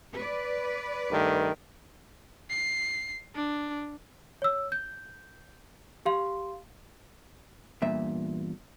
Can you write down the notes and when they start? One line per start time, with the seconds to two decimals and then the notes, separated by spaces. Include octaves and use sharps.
0.13 B4 D5
1.10 G2 D#3 A3
2.50 C7
3.36 D4
4.42 C#5 E6
4.72 G6
6.06 G4 F5 C6
7.82 E2 G2 A#2 E5